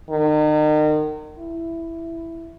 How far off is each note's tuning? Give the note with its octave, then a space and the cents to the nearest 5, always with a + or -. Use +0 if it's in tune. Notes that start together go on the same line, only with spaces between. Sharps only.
D#3 -35
E4 +5